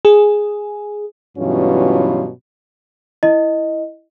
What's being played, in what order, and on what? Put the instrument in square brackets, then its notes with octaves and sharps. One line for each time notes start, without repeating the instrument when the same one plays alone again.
[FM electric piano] G#4
[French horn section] G2 B2 E3 F#3 C#4 F4
[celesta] E4 D#5